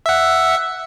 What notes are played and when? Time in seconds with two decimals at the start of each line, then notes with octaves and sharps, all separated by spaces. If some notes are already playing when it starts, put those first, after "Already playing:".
0.06 E5 F#5